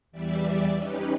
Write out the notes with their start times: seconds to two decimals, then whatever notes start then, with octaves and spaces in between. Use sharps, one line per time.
0.12 E2 E3 G3 D5 E5
0.76 C#4 D#4 G4 B4